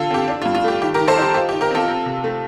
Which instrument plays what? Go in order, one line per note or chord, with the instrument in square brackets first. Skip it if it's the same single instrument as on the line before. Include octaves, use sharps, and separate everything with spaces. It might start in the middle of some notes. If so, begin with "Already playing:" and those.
Already playing: [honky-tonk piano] D3 F4 A4
C4 G4
D4
F4
G2
F4
A3 G4
D#3 G4
G4 A#4
D#3
A4 C5
D#4 G4
F4 G4
G4
D#3
G4 A#4
C4 F4 A4
C4
C3
A3